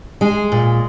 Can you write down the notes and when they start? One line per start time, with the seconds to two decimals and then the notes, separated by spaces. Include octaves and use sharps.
0.21 G#3 G#4
0.52 A#2